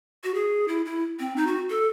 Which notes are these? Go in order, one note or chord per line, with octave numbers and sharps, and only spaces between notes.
F#4
G#4
E4
E4
C4
D#4
F#4
A4